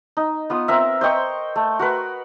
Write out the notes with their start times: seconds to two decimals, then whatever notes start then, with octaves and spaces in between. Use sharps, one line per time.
0.17 D#4
0.50 B3 F4 D#6
0.68 C4 A#4 E5
1.01 C5 D#5 G5 C#6
1.56 A3
1.79 F#4 A#4 B4